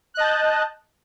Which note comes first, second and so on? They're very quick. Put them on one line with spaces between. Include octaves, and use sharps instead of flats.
F#6 D#5 A5 G6